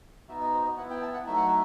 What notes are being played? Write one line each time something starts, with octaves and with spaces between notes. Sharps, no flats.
B3 D#4 F#4 E5
D#5
C5
D#5
B3 E4 F#5
G5
A5
F#5
F#3 A3 D#4 E5
F#5
E5